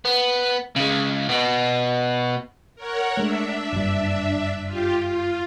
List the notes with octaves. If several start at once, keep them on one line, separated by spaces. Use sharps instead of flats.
B3
C#3 G#3
B2 B3
A#4 C#5 F#5
G#3 A3 D4 E5
F#1 G2
F4 G4
F4